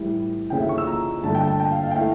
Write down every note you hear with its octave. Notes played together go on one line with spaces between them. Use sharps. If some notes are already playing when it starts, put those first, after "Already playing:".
Already playing: A2 E3 G3
D2 C#3 E3 G5
E5
C#6
E6
A#5
G2 D3 A3 A5
G5
A5
G5
F5
F5
G5
E3 A3 F5